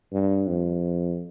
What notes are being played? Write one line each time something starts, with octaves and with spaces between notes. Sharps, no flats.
G2
F2